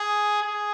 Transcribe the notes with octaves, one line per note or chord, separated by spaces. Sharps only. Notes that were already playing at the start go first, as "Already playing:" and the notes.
Already playing: G#4
G#4